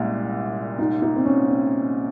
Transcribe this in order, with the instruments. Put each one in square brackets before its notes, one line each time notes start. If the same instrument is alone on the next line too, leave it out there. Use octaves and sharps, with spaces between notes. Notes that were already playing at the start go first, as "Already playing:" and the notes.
Already playing: [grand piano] C2 A#2 G#3 [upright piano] C#4
[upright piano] D#4
D#4
C4
C#4
C4